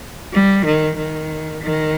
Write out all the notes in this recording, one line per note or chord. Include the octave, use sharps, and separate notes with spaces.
G3
D#3
D#3
D#3